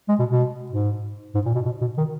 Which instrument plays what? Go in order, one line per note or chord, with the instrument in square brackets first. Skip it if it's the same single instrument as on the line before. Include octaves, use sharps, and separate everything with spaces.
[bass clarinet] G#3
B2
B2
G#2
G#2
A#2
B2
B2
B2
D#3